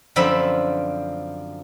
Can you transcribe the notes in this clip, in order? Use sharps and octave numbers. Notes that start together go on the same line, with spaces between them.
F#2 D3 F3 C4 E5 B5